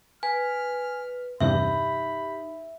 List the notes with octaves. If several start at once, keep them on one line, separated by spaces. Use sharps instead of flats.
B4 G#5 F6
E2 G2 C3 D#4 G4 E5 B5